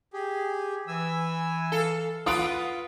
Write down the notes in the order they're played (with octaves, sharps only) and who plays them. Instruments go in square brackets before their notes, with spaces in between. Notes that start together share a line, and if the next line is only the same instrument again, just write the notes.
[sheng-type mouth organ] G4 G#4
[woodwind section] E3 [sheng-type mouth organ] G#5 E6
[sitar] A4 [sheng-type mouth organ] F5
[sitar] F4 B4 [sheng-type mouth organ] F#5 [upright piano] D#6 D7